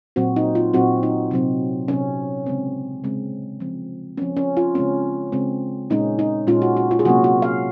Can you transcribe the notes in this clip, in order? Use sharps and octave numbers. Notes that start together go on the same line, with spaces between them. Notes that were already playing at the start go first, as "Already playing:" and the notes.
A#2 F#3 C4 F#4
D#4
F4
A#2 F#3 C4 F#4
D#4
C3 F#3 C4
C3 F#3 C4 C#4
C#3 G#3 C4
C#3 G#3 C4
F3 C4
F3 C4 C#4
C#4
F4
C#3 G#3 C4 C#4
C#3 G#3 C4
A#2 G#3 C#4 D#4
D#4
A#2 G#3 C#4 F4
F#4
F#4
F4
G#4
C3 F#3 A#3 C#4 F#4
F#4
F5